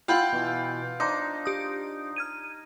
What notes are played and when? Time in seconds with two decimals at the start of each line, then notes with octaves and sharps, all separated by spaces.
0.08 F4 F#5 G5 B5 E6
0.33 B2 E3
1.00 D4 D#4 C5 C6 D6
1.45 G4 D#6
2.16 F6 G#6 D#7